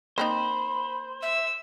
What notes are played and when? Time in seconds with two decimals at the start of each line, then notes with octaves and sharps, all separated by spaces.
0.18 A#3 C4 D#4 C5 B5
1.22 E5 E6